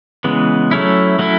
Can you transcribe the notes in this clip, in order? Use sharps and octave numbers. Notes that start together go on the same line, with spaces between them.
C#3 E3 G#3 B3
F#3 A3 C#4 E4
F#3 A3 C#4 E4